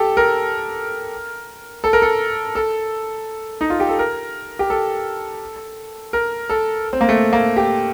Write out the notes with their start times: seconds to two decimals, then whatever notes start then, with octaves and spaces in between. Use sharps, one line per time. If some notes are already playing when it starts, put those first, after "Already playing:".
Already playing: G4 A4
0.17 A#4
1.84 A4
1.93 A#4
2.02 A4
2.55 A4
3.61 D#4
3.70 F4
3.80 G4
3.89 A4
3.99 A#4
4.59 G4
4.70 A4
6.13 A#4
6.50 A4
6.93 C4
7.01 A#3
7.09 A3
7.33 A#3
7.57 G4